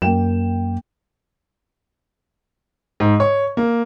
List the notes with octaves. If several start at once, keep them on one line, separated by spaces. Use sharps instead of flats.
F#2 A#3 G5 E7
G#2
C#5
A#3